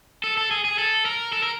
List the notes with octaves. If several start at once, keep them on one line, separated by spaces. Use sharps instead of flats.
A4
A4
G#4
G#4
A4
A#4
A4
A#4